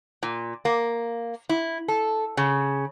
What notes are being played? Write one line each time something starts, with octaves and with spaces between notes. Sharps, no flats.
A#2
A#3
E4
A4
C#3